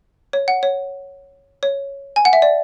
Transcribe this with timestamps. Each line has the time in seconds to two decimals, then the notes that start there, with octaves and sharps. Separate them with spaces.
0.33 C#5
0.48 F#5
0.63 C#5
1.63 C#5
2.16 G#5
2.25 F#5
2.33 E5
2.42 D5